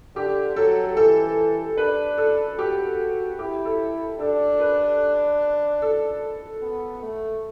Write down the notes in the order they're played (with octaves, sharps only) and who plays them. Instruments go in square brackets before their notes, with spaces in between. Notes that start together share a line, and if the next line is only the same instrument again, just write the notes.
[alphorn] D3 [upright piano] G4
[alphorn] F#3 [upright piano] A4
[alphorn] E3 [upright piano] A4
[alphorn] D4 [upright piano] B4
[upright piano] A4
[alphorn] F#4 [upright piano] G4
[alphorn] E4 [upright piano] G4
[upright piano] A4
[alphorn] D4 [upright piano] A4
[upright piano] B4
A4
[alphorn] B3
A3